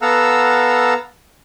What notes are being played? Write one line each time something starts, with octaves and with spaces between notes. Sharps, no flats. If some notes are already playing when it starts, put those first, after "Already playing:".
B3 A4 F5 F#5 A#5 E6